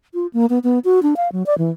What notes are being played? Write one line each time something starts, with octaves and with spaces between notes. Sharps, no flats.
F4
A#3
B3
B3
F#4
D4
F5
F#3
D5
E3